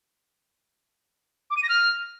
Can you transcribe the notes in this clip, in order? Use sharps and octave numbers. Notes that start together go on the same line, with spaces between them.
D6
D#7
A#6
F6